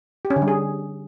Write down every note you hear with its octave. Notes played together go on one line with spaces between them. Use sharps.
G4
C#4
D3
G3
G#4